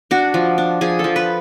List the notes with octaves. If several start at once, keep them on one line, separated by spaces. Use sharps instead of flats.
D4 F#4
F3
D4
F3 G#4
F3 A4
B4